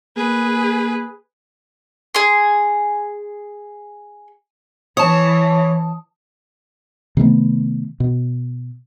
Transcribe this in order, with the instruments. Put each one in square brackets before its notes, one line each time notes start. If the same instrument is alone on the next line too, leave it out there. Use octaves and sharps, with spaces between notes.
[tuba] A#3 [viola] G#4 B4
[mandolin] G#4 C6
[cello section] E3 [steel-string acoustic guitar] C#5 [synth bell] A5 D#6
[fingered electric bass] C3 D#3 A3 B3
B2